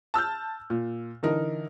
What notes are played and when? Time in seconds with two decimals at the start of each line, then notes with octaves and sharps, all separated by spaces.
0.14 A5 E6 F6 G6
0.70 A#2
1.23 D3 E3 D#4 A#4